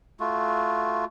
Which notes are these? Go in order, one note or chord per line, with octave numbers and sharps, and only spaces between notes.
A3 F4 F#4